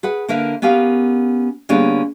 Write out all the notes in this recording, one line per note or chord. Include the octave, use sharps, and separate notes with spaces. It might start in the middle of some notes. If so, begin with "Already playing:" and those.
G#4 B4 F#5
D3 A#3 A#4 B4 E5
B3 C#4 G4 A#4 F5
D3 G3 A#3 B3 C#4 G#4